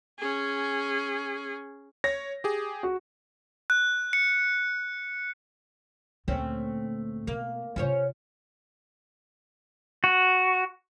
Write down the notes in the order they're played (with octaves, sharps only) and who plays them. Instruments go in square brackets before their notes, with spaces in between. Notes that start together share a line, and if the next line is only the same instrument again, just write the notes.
[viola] C#4 G#4
[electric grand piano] C#5 [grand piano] A#6
[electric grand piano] G4 G#4
[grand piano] F#4
[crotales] F#6
C#7
[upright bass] D2 A#2 [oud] A3 C4 C#4
[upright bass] B2 [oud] A#3
[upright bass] C3 F4 [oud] C#4 C5 C#5
[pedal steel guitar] F#4